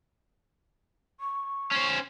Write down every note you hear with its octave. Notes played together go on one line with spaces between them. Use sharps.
C#6
C#4 C5